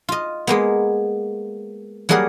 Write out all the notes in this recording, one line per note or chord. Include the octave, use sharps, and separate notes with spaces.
F4 D#5
G#3 A#3 B3
F#3 G3 A#3 G#4 A#4 F#5